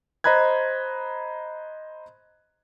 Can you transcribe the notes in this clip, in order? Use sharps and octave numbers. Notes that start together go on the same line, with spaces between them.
C5 D#5 A#5 B5 F#6 G#6